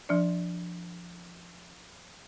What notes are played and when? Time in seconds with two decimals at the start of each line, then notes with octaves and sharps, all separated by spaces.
0.09 F3 D4 D5